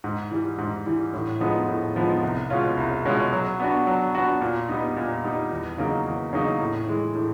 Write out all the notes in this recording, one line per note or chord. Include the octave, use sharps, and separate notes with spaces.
G#2
E3 G3
G#2
E3 G3
A2
F3 G#3 B3 D#4
A2
F3 G#3 B3 D#4
C2
B2 G#3 C#4 F4
C2
B2 G#3 C#4 F4
F#3
B3 D4 F#4
F#3
B3 D4 F#4
A#2
G3 B3 D#4
A#2
G3 B3 D#4
E2
C#3 F#3 A#3 D#4
E2
C#3 F#3 A#3 D#4
A2
E3 G#3
A2